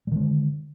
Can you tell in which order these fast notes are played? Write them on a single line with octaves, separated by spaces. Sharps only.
G3 D#3 G#3 D3